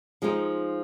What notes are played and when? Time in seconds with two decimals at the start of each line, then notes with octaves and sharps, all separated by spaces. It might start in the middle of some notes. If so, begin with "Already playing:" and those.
0.22 F3 G#3 D#4